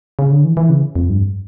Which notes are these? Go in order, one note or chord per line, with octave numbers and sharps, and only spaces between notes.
C#3
D3
E3
E3
C#3
F2
G2